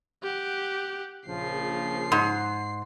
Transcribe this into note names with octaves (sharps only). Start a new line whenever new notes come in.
G4 F#5
A#1 C#3 F3 C7
G#2